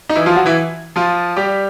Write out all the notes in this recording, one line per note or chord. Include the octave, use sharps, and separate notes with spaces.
D#4
E3 E4
F3 F4
F#3 F#4
E3 E4
F3 F4
G3 G4